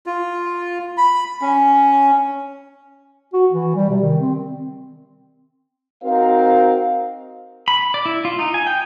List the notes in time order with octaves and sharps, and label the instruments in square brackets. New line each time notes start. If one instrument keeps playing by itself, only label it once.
[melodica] F4
B5
C#4
[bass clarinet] F#4
E3
G3
C3
D#3
C4
[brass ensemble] C4 D#4 F#4 A#4 C5 F5
[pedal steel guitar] B5
D5
E4
F4
D#4
G#5
G5